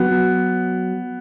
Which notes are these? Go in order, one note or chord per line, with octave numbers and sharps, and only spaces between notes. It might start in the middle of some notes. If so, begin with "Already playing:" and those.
Already playing: F#3 B3